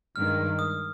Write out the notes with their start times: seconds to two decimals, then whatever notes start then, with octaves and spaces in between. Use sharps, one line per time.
0.16 G2 D#3 G#3 F6
0.59 D#6